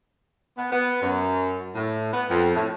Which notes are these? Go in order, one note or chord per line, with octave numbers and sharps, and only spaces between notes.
B3
B3
F#2
A2
B3
F2
A2